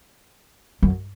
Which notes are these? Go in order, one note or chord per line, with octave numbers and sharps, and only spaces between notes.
F#2